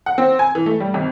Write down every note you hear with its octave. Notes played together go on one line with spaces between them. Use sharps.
F#5
C4
G#5
E3
A3
G3
G#1